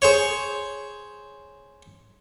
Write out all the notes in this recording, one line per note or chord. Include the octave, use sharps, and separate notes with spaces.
G#4 C5 C#5